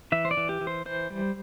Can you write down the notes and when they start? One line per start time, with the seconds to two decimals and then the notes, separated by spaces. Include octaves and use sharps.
0.12 E3 E5
0.25 C5
0.31 D5
0.37 E3
0.49 G4
0.61 E3
0.67 C5
0.86 E3 C5
1.10 G3